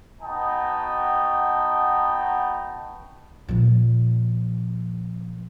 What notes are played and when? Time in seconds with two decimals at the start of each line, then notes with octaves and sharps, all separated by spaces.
0.22 B3 D#4 F#4 D#5 G5 A5
3.49 A#2 F3